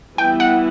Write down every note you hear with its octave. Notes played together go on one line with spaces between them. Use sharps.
E3 G3 B3 E4 G5
F#5